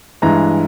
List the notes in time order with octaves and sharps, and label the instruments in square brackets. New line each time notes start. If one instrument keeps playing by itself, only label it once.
[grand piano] G2 E3 G#3 A#5